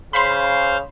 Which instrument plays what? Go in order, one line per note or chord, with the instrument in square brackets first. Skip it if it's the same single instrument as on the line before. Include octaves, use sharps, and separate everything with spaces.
[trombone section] C#3 [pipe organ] C5 F5 [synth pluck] B5 C6